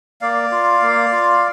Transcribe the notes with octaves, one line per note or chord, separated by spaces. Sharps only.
A#3 D5 F5
F4
A#3
F4